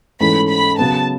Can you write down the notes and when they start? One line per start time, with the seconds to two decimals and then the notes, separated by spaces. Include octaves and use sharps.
0.21 G#2 E3 A3 C#4 B5
0.50 B5
0.78 C#3 F#3 B3 A5